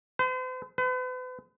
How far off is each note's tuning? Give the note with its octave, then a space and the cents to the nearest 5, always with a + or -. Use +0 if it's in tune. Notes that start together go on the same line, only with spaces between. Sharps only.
C5 -45
B4 +40